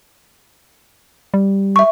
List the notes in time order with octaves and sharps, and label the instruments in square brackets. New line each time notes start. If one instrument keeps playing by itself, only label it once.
[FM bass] G3
[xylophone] E5 C#6